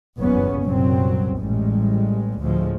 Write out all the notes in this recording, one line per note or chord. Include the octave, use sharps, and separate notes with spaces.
F#1 B1 E2 G2 B3 C#4
C2 F#2 A#2 F#3 C4
A1 G3 G#3
D2 A2 F3 G#3